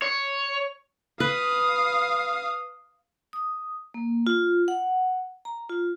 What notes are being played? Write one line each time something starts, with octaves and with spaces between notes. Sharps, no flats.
C#5
B4 F5 D#6
D#6
A#3
F4
F#5
A#5
F4